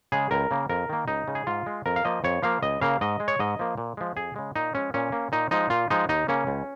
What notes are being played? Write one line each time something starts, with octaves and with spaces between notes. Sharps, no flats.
C#3 G#3 G#4
C#2 A#4
C#3 A#3
F2 A#4
D#3 A#3
C#2 D#4
C#3 G#3
G#4
G#2 F4
G#3
F2 A#4
F5
F3 A#3 D#5
F2 C#5
F3 A#3 F5
C#2 D#5
C#3 A#3 F5
G#2 D#5
G#3
C#5
G#2 D#5
F3 A#3
A#2
F3 G#3
F2 G#4
C#3 G#3
A#2 D#4
F3 G#3 C#4
A#2 C#4
A#3
A#2 D#4
F3 G#3 D#4
A#2 F4
F3 G#3 D#4
D#2 D#4
C#3 A#3 C#4
C#2